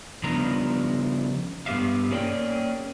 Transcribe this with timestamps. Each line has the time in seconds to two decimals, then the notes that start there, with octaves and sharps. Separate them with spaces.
0.23 C#3 F3 G3 B3 D4 A#5
1.66 G2 B3 G4 E5 F5
2.10 A#3 C#4 G#4 B4 D5 G5